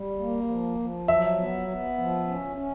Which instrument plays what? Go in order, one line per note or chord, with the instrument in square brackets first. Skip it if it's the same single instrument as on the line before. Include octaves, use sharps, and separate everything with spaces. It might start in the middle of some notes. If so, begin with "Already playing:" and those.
Already playing: [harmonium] G3
A#3
F3
F3
[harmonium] F#3 [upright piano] E5
[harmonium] B3
B3
F3
C#4
C#4